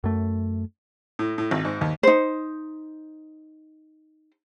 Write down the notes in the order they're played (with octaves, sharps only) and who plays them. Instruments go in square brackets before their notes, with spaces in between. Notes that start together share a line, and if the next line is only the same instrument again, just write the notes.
[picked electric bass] F#2 A3
[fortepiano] A2
A2
G#1
G#2
D#2
[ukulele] D#4 C5